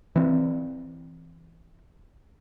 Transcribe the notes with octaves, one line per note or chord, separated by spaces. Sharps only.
E3 C4